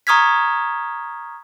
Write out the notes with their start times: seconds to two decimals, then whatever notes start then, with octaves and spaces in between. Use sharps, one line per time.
0.07 A#5 C#6 D#6 F6 G#6 B6